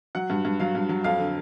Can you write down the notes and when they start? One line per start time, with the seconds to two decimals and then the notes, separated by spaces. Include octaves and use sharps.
0.15 F#3 F#5
0.30 G2
0.45 G2
0.60 F#3 F5
0.75 G2
0.89 F#3
1.04 F2 F5
1.19 D3